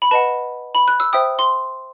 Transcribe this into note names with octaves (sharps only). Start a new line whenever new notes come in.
B5
B4 D#5 F#5 A5
B5
F#6
E6
C5 E5 G5 D#6
C6